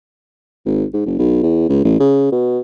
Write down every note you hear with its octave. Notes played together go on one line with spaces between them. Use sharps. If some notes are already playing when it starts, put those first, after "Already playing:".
G#1
G#2
F#1
B1
E2
C#2
A1
C#3
B2